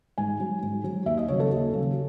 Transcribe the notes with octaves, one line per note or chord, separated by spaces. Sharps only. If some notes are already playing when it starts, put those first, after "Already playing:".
G#2 G#5
F#3
G#2
F#3
D#2 E5
D#5
C#3 F#3 C#5
A4
D#2
C#3 F#3